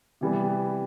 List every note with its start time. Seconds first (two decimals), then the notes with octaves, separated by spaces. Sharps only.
0.21 C3 E3 G3 B3